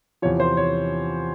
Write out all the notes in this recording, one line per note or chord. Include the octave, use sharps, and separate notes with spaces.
E2 C3 F3 C#5
C5
C#5